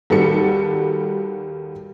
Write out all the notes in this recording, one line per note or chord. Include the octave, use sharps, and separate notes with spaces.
D#2 G3 F#4 A4 C#7